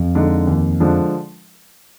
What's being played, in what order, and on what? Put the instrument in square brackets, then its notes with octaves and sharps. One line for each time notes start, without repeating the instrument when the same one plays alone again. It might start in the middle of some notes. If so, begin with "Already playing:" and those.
Already playing: [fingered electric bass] F2
[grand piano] D3 G#3 D#4
D#2
D3 F3 G#3 D4